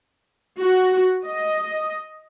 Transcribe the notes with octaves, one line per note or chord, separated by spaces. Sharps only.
F#4
D#5